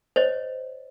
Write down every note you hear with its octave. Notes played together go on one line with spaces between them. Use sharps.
C5 C#5 D#5